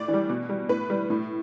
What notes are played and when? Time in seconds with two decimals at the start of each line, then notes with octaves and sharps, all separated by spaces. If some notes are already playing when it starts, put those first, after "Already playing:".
Already playing: A2 D5
0.08 E3
0.13 G3
0.29 B2
0.49 G3
0.69 A2 B4
0.90 G3
1.10 A2